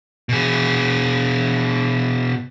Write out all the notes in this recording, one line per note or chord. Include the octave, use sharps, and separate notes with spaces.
B2 G#4